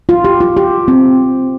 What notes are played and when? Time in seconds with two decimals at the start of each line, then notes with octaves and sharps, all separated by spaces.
0.09 F4
0.25 G4
0.40 F4
0.57 G4
0.88 C4